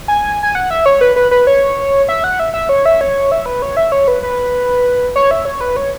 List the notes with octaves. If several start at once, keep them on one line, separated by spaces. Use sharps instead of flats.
G#5
G#5
F#5
E5
C#5
B4
B4
B4
C#5
E5
F#5
E5
E5
C#5
E5
C#5
E5
B4
C#5
E5
C#5
B4
B4
C#5
E5
C#5
B4
C#5